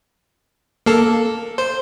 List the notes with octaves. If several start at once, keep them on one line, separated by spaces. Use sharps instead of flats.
A#3 A4
C5